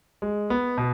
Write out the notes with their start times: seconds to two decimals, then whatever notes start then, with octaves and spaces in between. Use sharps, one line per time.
0.22 G#3
0.50 B3
0.78 B2